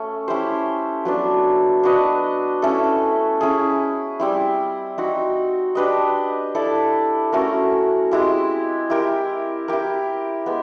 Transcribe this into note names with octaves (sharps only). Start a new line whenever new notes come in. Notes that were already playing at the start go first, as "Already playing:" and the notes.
Already playing: A3 C#4
C#4 E4 G4 C5
F#3 B3 D4
D4 F#4 B4 D#5
A3 C#4 E4 A4
C#4 E4 G#4
G3 C4 E4
C4 D#4 F#4
D4 G4 B4 D#5
E4 A4 D5
A3 C#4 F#4 A#4
G#3 C4 E4 G4
E4 G4 A#4
E4 G4 A#4
G#3 B3